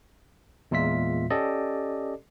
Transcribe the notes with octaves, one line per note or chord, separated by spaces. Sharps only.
E2 A#2 G#3 F4 E5 B6
C#4 G4 A4 D5 D#5